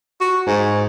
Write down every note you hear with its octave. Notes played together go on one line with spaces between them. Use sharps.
F#4
G#2